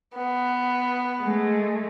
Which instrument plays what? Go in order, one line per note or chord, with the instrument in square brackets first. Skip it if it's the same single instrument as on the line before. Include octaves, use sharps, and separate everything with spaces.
[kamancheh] B3
[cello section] G#3 A3